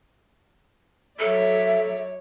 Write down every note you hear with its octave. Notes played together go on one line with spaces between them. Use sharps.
F#3 A4 C#5 D5 E5